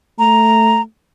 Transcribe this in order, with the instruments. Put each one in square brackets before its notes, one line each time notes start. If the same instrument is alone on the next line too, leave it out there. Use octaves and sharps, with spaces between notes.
[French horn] A3 [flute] A#5